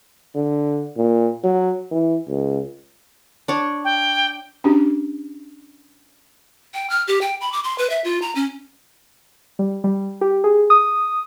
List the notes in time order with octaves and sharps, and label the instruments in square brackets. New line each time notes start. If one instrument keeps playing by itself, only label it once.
[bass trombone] D3
A#2
F#3
E3
C#2
[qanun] D4 C#5
[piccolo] G5
[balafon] C#4 D4 F#4 G4
[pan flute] G5
F6
G4
G5
B5
D6
C6
B4
E5
F4
A#5
C#4
[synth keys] G3
G3
G4
G#4
D#6